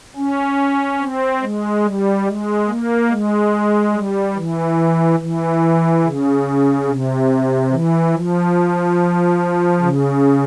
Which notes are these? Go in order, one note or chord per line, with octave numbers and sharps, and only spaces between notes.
C#4
C4
G#3
G3
G#3
A#3
G#3
G3
E3
E3
C#3
C3
E3
F3
C#3